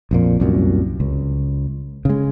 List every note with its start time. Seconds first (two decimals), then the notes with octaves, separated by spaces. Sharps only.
0.11 A#1 F2 A#2
0.40 C2 F#2 A#2
1.00 C#2
2.05 C#3 G#3